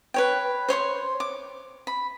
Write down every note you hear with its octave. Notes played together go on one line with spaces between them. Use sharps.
B4 C#5 G5
C5 C#5 C6 C#6
D6
B5